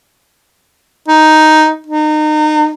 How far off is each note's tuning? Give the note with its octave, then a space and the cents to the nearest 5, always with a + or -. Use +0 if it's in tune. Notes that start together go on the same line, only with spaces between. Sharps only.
D#4 +5
D#4 -30